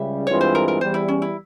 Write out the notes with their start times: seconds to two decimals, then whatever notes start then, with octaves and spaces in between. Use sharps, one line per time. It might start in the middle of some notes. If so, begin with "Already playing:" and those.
Already playing: C#2 C#3 G3 E5
0.27 G2 E3 G#3 C4 F4 C#5
0.41 C5
0.55 A#4
0.68 A#4
0.81 E2 E3 G3 C5
0.94 E4
1.08 C#4
1.22 E4